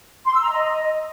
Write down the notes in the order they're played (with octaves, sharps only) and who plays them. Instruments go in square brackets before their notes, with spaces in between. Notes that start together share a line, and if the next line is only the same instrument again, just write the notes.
[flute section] C6
E6
A#5
D#5